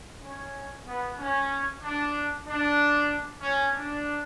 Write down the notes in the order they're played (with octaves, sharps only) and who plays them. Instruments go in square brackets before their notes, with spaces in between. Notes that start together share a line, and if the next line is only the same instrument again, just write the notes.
[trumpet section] C#4
B3
C#4
D4
D4
C#4
D4